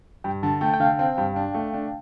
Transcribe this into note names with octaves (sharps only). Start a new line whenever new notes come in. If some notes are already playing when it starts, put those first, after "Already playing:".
G2 G5
D3 A5
A3 G5
G5
D3 F5
C4
G2
D4
A3
D4